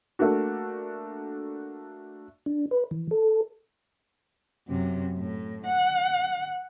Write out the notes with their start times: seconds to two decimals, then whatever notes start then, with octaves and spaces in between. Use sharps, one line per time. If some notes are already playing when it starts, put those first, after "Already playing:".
0.19 A3 A#3 D4 F#4
2.46 D4
2.71 B4
2.91 E3
3.11 A4
4.68 F#2 C3
5.18 A2
5.66 F#5